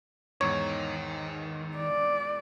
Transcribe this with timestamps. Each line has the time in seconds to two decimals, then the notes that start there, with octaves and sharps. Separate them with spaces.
0.41 E2 G#2 D#3 C#5
1.77 D5